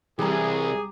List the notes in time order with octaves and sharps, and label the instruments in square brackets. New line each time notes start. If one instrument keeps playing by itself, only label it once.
[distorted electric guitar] C2 [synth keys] E3 G3 [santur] G4 A#5 [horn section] G#4